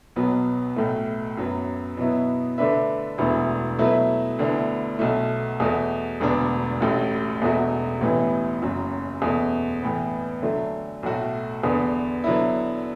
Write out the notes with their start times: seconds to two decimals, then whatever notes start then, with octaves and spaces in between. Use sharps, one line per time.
0.16 B1 B2 F#3 B3
0.76 B1 A2 A3
1.37 F#2 F#3 B3
1.97 B2 F#3 B3 E4
2.58 D3 A3 D4 B4 E5
3.18 E1 D2 D3 B3 E4
3.79 B2 F#3 A3 E4 B4
4.39 D2 D3 B3 E4
4.99 B1 B2 A3
5.60 E2 B2 A3 F#4
6.20 E1 D2 D3 B3 D4
6.81 A1 A2 A3 F#4
7.41 E1 E2 B2 A3 F#4
8.01 A1 A2 E3 B3 E4
8.62 F#1 F#2 F#3
9.22 E2 B2 A3
9.82 A2 E3 B3
10.42 D3 F#3 A3
11.03 B1 A2 A3 F#4
11.63 E2 D3 B3
12.24 D3 F#3 B3 E4